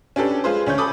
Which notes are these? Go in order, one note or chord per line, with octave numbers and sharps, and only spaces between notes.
C#4 D4 G4 A4 B4
G#3 F4 G#4 B4 C5
D2 C#4 C#5 G6
A4 B5 D6 D#6